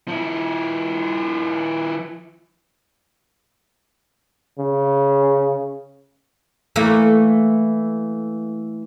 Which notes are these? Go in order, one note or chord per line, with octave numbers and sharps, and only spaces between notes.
F3 E4
C#3
E3 A3 A#3